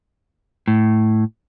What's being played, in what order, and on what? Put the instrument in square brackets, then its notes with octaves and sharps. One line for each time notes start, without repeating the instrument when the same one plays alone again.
[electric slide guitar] A2